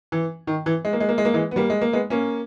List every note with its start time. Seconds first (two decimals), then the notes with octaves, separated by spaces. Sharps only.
0.12 E3
0.47 D#3
0.66 E3
0.85 G#3
0.93 A#3
1.00 G#3
1.09 A#3
1.18 G#3
1.25 A#3
1.34 E3 G#3
1.51 B3
1.56 G3 A#3
1.70 G#3
1.81 A#3
1.93 G#3 B3
2.10 A#3 C#4